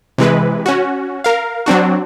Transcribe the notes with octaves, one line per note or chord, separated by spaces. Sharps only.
C3 E3 G#3 B4
C#4 F#4
A#4 F5
F#3 C4 D4 F#4